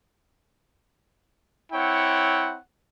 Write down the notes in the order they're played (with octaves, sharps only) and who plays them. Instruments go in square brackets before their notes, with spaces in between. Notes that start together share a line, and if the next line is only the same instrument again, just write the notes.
[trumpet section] C4 E4 C#5 F#5 G5